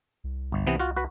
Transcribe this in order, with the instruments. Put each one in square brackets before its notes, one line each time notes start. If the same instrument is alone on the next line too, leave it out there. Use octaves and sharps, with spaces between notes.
[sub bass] C2
[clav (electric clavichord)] G1
C3 E3 B3
F4 F#4
F#4 B4